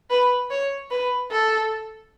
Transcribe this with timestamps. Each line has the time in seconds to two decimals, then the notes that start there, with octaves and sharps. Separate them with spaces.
0.10 B4
0.51 C#5
0.91 B4
1.31 A4